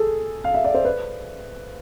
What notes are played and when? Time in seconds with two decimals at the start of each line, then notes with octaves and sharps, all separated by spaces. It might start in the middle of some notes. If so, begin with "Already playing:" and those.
Already playing: G#4 A4
0.44 F5
0.54 E5
0.64 D5
0.75 C5
0.85 B4